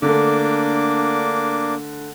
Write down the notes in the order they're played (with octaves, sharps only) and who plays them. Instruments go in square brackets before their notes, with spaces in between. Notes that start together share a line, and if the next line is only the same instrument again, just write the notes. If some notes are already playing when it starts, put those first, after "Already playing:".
[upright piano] D3 A3 [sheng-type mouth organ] A#3 D4 D6